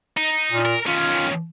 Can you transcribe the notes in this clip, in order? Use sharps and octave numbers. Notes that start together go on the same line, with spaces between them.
D#4
A#2
A#4
D#3 C#4 F4